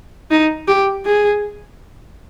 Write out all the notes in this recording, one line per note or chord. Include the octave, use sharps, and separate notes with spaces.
D#4
G4
G#4